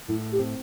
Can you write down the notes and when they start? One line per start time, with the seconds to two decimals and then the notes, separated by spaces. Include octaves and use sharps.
0.08 A2 E4
0.32 G4
0.39 C4